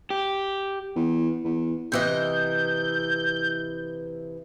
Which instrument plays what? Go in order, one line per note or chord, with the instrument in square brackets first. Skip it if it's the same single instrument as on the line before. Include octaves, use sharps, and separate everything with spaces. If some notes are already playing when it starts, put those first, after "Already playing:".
[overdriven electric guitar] G4
[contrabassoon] E2
E2
[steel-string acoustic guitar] C3 E3 D#5 [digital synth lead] G6